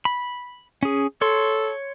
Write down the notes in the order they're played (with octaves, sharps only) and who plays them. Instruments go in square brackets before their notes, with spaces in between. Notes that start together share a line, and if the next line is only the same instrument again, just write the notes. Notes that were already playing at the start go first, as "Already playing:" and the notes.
[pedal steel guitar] B5
C#4 G#4
[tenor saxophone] A4 [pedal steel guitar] C#5 C6